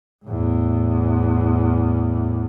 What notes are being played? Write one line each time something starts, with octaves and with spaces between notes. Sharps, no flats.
E2 A2